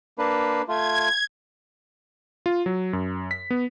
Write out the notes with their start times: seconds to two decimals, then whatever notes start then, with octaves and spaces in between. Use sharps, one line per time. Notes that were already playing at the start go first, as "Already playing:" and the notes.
0.18 A#3 D4 B4
0.68 A3 F4 G#6
2.46 F4
2.66 F#3
2.93 F#2
3.31 B6
3.50 B3